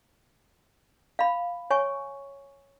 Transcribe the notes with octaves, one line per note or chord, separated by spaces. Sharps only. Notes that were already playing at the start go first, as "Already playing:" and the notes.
F5 B5
C#5 G#5 C#6